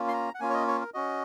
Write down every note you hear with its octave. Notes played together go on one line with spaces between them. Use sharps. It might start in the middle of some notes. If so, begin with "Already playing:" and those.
Already playing: A#3 C#4 F4
C6
A#5
F#5
A#3 C#4 F4 G#5
C#5
D#5
C#5
A#4
C#4 F#4 D#5